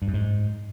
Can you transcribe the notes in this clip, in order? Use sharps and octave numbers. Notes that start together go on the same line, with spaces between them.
G2
F#2
G#2